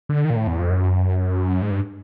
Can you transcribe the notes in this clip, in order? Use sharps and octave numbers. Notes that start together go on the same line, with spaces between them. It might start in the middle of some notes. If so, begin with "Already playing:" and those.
D3
D#3
A#2
A2
E2
F2
F#2
G#2
G2